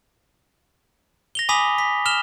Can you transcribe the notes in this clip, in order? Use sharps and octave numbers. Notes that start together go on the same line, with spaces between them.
A#6 F7 G7
G#5 B5 D6 D#6 B6 F7
B6
F6 E7 F7 G7